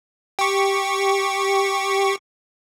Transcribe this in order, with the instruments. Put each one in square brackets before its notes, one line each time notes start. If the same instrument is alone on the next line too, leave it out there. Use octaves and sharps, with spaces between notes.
[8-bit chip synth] G4 C#6